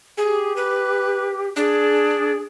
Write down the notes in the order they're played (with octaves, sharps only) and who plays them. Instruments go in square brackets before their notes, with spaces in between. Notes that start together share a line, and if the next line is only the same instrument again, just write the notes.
[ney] G4 [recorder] G#4
[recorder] B4
[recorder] D4 [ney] G#4